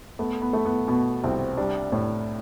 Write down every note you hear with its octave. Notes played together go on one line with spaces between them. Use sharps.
A3 B3
B3
A3
B3
B2 B3
C2 C4
G3 D4
A2